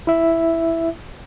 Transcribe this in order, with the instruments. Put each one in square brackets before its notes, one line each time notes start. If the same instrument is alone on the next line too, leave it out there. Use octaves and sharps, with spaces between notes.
[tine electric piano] E4 E5